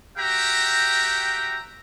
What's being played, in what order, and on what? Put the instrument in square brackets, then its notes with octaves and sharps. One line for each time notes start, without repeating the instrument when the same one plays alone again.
[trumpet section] F#4 G4 E5 G5 A#5